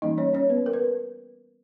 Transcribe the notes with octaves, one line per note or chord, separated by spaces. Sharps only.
E3 G3 A#3 C#4 D#4 D#5
C#4 C#5
C#4 C#5
B3 B4
A#4
B4